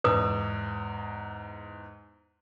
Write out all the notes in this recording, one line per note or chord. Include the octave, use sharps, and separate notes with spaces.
E2 G#2 B4 D#6